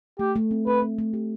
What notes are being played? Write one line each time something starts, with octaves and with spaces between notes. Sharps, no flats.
A3 G4
A3
C4
C4 B4
C4
A3
G4